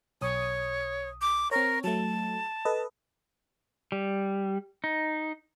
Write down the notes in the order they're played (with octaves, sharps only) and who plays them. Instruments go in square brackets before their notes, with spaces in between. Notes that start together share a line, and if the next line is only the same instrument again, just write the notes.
[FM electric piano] B1 D#6 [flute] C#5
[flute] D6
[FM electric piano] C4 C#5 [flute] A#4
[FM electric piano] F#3 A3 [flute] A5
[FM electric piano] A4 B4 D#5
[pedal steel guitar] G3
D#4